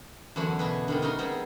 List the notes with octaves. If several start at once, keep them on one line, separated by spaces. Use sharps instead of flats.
E2 D3 F#3 C#4 D4 E4
B2 G#4 B4
D3 D#3 G3
C#3 G3 D#4 A#4 D#5 C6
G3 B3 C4 G#4 C5